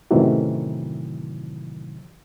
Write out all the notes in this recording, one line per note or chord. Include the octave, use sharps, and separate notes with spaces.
F#2 A2 C3 D#3 E3 F#3